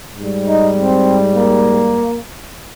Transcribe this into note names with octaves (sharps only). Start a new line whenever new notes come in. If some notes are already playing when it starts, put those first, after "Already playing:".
G#2 G3
D#4
C4
A#3